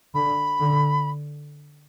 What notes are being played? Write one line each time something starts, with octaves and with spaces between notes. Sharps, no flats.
D3 B5
D3